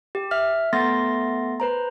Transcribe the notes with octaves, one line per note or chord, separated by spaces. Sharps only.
G4
E5 F6
A3 B3 A4 C6 A6 A#6
B4 C5 A#5